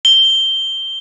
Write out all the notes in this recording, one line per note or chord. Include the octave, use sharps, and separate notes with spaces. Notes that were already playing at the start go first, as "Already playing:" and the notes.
G7